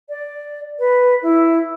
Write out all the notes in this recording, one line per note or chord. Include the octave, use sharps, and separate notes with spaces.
D5
B4
E4